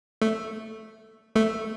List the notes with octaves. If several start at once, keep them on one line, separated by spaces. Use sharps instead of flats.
A3
A3